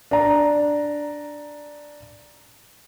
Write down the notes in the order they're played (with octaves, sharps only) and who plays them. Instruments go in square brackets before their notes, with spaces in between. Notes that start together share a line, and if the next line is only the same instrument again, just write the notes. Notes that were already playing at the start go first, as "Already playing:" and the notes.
[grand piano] D4 A#5